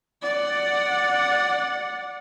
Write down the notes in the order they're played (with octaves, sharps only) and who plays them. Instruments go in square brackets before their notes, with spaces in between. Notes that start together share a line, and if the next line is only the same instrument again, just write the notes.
[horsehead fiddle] D5 F#5